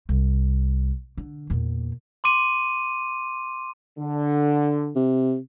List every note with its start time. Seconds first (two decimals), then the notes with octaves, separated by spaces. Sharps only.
0.09 C2
1.17 D3
1.50 E2 A#2
2.24 C6 D6 D#7
3.98 D3
4.96 C3